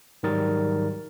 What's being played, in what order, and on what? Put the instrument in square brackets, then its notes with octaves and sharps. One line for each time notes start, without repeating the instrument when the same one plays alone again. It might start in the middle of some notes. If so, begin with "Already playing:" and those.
[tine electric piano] G#2 D#3 F#3 G3 A#4 A6